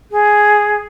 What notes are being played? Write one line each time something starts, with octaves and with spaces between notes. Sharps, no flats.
G#4